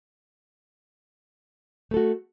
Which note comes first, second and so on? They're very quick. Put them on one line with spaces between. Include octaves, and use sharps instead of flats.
A3 A4 F#4